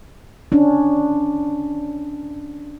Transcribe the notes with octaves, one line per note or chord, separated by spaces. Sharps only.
C#4 D4